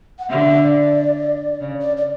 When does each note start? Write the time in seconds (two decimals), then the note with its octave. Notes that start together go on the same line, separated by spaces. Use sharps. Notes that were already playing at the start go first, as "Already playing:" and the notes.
0.19 F#5
0.30 D3 E5
0.62 D5
1.60 C#3
1.81 D5
1.97 D5